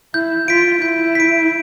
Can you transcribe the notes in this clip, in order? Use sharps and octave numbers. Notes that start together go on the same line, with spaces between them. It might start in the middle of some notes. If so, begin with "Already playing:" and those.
E4 G6
F4 B6 D7
E4 G6
B6 D7